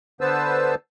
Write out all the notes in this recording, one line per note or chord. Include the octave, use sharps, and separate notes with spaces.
D3 B3 B4 C5 A5 E6